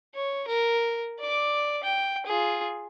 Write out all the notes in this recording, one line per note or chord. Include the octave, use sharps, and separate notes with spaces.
C#5
A#4
D5 D6
G5
F4 G#4